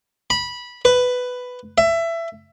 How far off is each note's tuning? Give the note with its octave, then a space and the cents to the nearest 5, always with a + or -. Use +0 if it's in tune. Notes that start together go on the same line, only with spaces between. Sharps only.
B5 -15
B4 +10
E5 +20